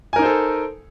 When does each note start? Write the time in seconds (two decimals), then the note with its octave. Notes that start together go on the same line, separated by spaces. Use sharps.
0.13 G#5
0.16 A#4
0.19 D#4
0.22 C5
0.25 A4